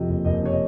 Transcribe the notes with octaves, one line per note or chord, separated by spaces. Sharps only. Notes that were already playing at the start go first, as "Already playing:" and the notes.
Already playing: F2 C3 D#5
F#1
F#1 D#5
C3 C#5
D#5